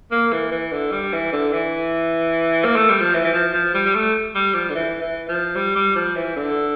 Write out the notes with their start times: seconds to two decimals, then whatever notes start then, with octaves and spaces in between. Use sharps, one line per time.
0.11 A#3
0.32 E3
0.52 E3
0.72 D3
0.92 G3
1.13 E3
1.32 D3
1.53 E3
2.64 A#3
2.76 A3
2.89 G3
3.01 F3
3.14 E3
3.24 E3
3.33 F3
3.54 F3
3.74 G3
3.85 G3
3.94 A3
4.35 G3
4.54 F3
4.69 D3
4.75 E3
5.02 E3
5.28 F3
5.55 G3
5.75 G3
5.95 F3
6.16 E3
6.36 D3